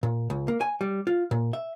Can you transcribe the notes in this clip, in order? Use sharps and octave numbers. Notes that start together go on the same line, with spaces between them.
A#2
C#2
A#3
G#5
G3
F4
A#2
E5